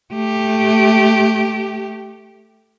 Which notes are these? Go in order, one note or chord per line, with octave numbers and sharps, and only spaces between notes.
A3 G4